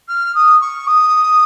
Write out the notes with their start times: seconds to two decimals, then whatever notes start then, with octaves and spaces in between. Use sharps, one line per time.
0.08 F6
0.35 D#6
0.60 C#6
0.87 D#6